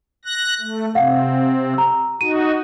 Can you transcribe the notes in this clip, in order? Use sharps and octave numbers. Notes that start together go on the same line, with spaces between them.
F#6 A#6
A3
C3 C4 F5 F#5
A#5 E6
D#4 F#4 D#7